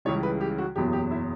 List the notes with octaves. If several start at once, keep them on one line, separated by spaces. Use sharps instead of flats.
C#2 C#3 E3 G3 C#5
B4
G4
F#4
F#1 E2 B2 F#3 G4
G4
E4